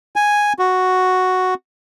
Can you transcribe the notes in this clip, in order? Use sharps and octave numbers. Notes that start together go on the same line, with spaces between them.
G#5
F#4